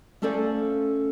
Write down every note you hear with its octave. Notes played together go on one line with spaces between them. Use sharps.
A3 C#4 A4 C5 D5 F5